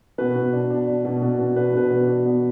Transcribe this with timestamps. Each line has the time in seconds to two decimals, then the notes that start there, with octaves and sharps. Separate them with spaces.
0.18 B2 B4
0.36 B2
0.53 D4
0.70 D4
0.87 D4
1.05 B2
1.22 B2
1.39 B2
1.56 D4 B4
1.73 B2 B4
1.91 B2
2.08 D4
2.26 B3